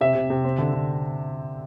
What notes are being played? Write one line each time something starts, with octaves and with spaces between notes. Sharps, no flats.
C3 E5
C3
C3
C4
D3
D3